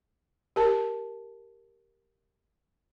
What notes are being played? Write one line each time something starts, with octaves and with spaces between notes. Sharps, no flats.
G4 A#4 A5